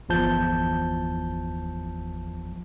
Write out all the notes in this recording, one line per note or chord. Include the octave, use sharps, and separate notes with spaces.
G1 E2 F3 A5 G6